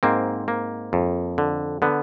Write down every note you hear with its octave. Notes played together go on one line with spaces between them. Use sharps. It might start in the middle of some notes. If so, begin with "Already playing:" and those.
G#2 A#3 C4
A#3
F2
D3
D3 B3